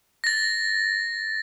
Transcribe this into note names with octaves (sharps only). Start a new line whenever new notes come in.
A6 A#6